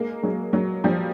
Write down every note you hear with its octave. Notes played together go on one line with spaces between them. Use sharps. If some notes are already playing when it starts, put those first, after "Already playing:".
Already playing: G#3 A#3
F#3 G#3
F#3 G#3
F3 G3